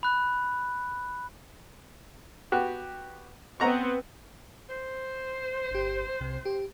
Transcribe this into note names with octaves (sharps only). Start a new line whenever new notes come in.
B5 F#6
B3 F#4 G4
B3 C4 F#5 A#5 C#6
C5
G1 G4
C2 C3
G4